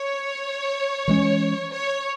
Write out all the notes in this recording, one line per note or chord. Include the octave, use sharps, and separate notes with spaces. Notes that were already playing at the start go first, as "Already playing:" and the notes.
Already playing: C#5
E3 G#3 C#4
C#5